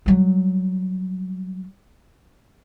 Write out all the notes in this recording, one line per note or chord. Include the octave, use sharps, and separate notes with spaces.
F#3 G3